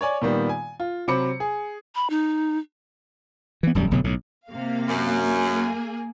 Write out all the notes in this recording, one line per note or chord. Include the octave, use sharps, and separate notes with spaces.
C#5 D5 G#5
A#2 D#3 G3 B3
G#5
F4
C3 F#3 C5 B5 D6 C#7
G#4
B5
D#4
E3 B3
D#1 F#2 G3
F1 B2 D3 F#3
B1 A2
C3 A#3 F5
F#2
A#3 G#4